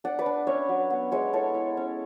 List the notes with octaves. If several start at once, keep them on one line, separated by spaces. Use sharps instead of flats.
D4 D5 F#5
B4 D5
D4
C#4 C#5 E5
F#3
B3
G#3 C#5 E5
E4 A4 C#5
E4
C#4